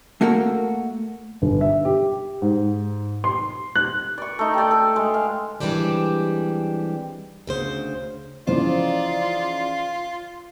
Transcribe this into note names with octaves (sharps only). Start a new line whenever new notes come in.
A3 A#3 F#4 A4 A#4
G1
E5
G4
G#2
C6
F#6
D5 C#6
A3 D#4
G4 D5
A4
G#3
F5
E3 G3 G#3 C4 D4 G4
D2 C#3 C5
C#3 E3 F3 D#4 F4 C5 D5